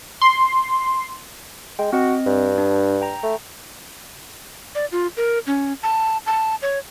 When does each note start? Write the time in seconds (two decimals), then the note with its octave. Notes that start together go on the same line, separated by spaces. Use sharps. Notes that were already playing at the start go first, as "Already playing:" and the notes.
0.22 C6
1.79 G#3 G5
1.92 C4 F#4 D#5
2.26 G2
2.58 D4
3.01 G5 A#5
3.23 A3
4.75 D5
4.92 F4
5.17 A#4
5.47 C#4
5.83 A5
6.26 A5
6.62 C#5